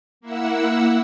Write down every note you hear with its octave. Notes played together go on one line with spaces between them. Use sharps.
A#3 E4 F#5 E6